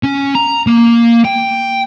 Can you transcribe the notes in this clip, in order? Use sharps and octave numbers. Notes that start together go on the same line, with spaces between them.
C#4
A#5
A#3
G5